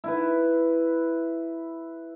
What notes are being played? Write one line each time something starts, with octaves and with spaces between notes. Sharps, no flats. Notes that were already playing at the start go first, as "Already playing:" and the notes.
E4 B4